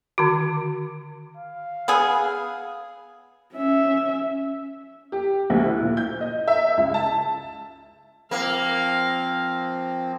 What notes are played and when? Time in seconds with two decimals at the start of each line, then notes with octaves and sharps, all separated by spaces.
0.18 D3 D#3 F#4
1.37 F5
1.88 B3 G#4
3.54 C#4 E5
5.12 G4
5.50 D2
5.65 E4
5.80 A#2
5.97 G6
6.21 D#5
6.48 E5
6.77 C#2
6.94 A5
8.31 F3 A#3 C4 F5